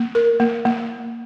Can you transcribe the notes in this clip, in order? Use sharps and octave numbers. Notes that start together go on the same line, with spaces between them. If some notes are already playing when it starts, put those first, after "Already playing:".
Already playing: A#3
A#4
A#3
A#3